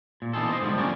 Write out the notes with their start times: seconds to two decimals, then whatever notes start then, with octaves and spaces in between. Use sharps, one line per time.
0.22 A#2
0.33 B2 D3 E3 D#4 F4 A4
0.49 C5 D#5
0.61 G#2 D3 F3 G3
0.78 F2 A#3 C#4 F#4 D5 G#5